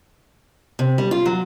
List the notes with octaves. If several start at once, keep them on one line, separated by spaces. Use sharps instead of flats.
C3
G3
F4
F#3